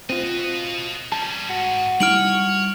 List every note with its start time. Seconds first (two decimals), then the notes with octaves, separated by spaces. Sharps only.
0.10 C4 F4 F#4 D#5
1.12 G3 C#4 A5
1.49 G#2 F#4
2.00 G3 D#4 E4 C#5 F6 D7 F#7